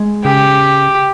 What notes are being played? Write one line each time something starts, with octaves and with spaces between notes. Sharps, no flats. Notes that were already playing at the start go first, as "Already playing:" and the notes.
Already playing: G#3
C#3 G4